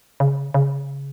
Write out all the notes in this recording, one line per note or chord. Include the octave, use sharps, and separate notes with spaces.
C#3
C#3